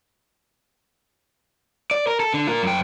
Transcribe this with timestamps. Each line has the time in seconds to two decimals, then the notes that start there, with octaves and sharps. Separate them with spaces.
1.91 D5
2.07 A#4
2.20 A4
2.34 D3
2.47 F4 A#4
2.63 F#2 G5